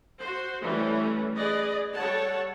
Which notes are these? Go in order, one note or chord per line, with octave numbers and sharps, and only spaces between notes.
F#4 C5
E3 G3 A3 C#4
G#4 B4 D5 D#5
G3 A4 C#5 F#5 A5